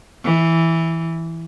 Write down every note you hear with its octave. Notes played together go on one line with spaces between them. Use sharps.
E3